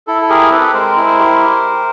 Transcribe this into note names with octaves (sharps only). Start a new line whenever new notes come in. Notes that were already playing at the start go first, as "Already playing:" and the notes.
E4 A4
A4
G4 G#4 A#4
C4 A4 B4
G#3 A#4 C5
E4
G4